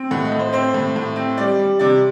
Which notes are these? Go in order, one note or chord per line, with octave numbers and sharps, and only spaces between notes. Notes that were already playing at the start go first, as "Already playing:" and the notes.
Already playing: C4
A2 F#5
D#5
A2
C5
C4 C5
A2
A2
C4
G3 D5
G3
C3 D5